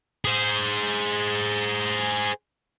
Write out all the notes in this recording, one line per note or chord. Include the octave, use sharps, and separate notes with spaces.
G#4 C5